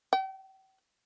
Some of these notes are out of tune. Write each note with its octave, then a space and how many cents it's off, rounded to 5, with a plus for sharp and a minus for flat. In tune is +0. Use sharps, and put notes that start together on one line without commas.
G5 -40